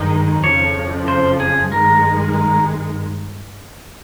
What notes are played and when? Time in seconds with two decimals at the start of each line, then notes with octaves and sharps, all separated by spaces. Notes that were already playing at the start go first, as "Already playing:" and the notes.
Already playing: G#1 G2 D#3 G#3 D#4
0.43 F2 C#3 F3 C#5
1.08 C5
1.40 G#4
1.72 G#1 G2 D#3 G#3 A#4